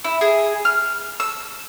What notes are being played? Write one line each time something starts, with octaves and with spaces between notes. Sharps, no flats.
E4
G#4
F6
E6